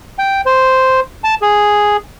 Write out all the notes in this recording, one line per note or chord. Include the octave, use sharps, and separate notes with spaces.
G5
C5
A5
G#4